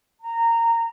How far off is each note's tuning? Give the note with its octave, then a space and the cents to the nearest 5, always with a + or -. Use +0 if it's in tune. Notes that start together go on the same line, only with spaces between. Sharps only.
A#5 -15